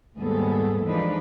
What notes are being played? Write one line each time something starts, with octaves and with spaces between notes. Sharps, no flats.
D#2 G#2 G3 B3 G#4 A4
E3 F3 G#3 D4 D#4 B4